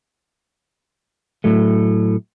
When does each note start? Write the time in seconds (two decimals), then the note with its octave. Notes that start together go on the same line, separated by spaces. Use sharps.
1.44 A2 F#3 A3